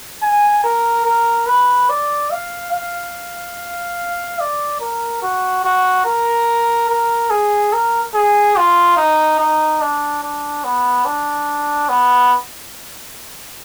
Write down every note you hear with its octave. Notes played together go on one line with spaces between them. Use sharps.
G#5
A#4
A#4
B4
D5
F5
F5
D5
A#4
F#4
F#4
A#4
A#4
G#4
A#4
G#4
F4
D#4
D#4
D4
D4
B3
D4
B3